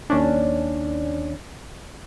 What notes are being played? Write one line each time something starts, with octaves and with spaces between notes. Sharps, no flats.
D#2 C#4 D4